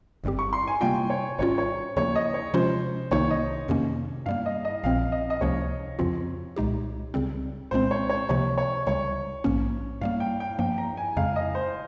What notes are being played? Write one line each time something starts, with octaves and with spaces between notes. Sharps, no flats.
G1 G2 G3 C4 G4
C#6
C6
G#5
C3 G3 A#3 F4 G5
C#5
G#1 G#2 G3 C#4 F4 C#5
C#5
D#2 C#3 F3 A#3 C#5
D#5
C#5
C3 F3 G#3 C#4 F4 C5
C2 C3 D#3 A#3 D#4 C#5
D#5
F2 C3 D#3 A#3 C#4
G2 G3 A#3 F5
D#5
D#5
A#1 A#2 F3 C4 F5
D#5
D#5
C#2 C3 F3 A#3 C#4 C#5
F2 C#3 F3 C4 F4
C2 A#2 G#3 D#4 G4
C#2 C#3 G3 C4
C2 A#2 G#3 C4 C5
C#5
C#5
C#2 C3 F3 A#3 C#5
C#5
C#2 C#3 G3 C#5
A#1 G#2 F3 A#3 C#4
G2 G3 A#3 F5
G5
G5
G2 F3 A#3 G5
A#5
G#5
F2 C#3 G#3 F5
D#5
C5